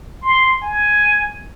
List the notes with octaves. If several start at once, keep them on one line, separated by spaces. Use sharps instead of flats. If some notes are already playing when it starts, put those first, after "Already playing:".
C6
G#5